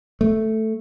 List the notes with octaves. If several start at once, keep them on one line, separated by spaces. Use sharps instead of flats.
A3